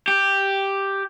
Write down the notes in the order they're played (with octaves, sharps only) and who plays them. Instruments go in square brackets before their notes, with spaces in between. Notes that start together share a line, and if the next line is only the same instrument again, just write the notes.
[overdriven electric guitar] G4